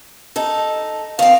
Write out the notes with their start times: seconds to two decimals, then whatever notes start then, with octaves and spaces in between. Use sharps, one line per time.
0.36 D#4 A4
1.19 D#3 C4 F5